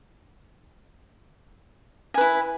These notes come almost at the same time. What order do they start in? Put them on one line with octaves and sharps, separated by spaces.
G#5 B4 E4